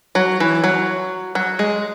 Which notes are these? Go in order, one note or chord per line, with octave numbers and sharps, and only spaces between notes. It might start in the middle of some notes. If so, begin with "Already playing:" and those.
F#3
E3
F#3
F#3
G#3